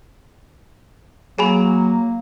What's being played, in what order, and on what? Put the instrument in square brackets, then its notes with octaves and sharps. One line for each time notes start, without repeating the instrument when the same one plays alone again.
[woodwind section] F#3 [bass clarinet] A#3 [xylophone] G#4 G#5 B5